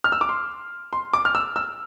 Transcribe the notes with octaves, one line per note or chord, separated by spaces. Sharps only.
F6
E6
D6
C6
C6
D6
F6
E6
E6